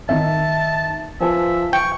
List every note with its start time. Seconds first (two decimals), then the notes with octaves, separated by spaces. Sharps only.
0.09 D#3 D#4 E5 A5
1.21 F3 B4 E5 G#5 A5
1.73 G5 C#6